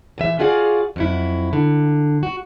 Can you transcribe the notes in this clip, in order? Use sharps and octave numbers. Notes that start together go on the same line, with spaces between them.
A#2 E3 E5
F4 F#4 G#4 D5 F5
F2 F#3 E4
D3
F#4